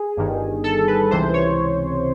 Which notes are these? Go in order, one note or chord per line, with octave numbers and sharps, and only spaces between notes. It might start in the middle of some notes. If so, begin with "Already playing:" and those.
Already playing: G#4
G1 G2 D#3
A4
B4
C#2 C3 E3 C5
C#5